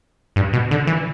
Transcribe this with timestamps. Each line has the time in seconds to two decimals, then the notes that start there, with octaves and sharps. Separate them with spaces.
0.36 G2
0.53 B2
0.71 D3
0.87 E3